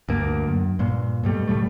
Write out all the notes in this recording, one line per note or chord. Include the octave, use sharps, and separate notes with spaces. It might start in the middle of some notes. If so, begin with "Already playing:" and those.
D2 G2 A#3
F#2
G2 A#2
G2 B2 G3 A3
F#1 A2 G3 A3